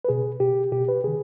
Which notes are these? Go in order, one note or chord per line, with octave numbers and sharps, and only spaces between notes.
B4
B2 G#4
B2 G4
B2 G4
B4
C3 D#3 G#4